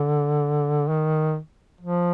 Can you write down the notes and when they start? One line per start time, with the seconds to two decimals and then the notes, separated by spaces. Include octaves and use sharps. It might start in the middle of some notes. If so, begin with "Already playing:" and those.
Already playing: D3
0.89 D#3
1.81 F3